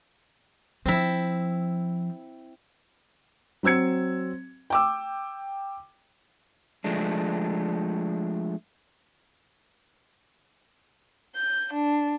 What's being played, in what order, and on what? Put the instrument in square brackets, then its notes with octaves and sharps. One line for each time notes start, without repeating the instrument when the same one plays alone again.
[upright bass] F3 [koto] C4 E4
[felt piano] F#3 C4 E6 G#6 C#7
G5 D6 E6
[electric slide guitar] F3 G#3 A3 D4
[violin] G6
D4